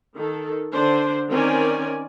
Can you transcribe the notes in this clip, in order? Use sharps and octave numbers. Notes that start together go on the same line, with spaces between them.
D#3 A4
D3 D4 C5
D#3 C4 C#4 A#4 D5 G#5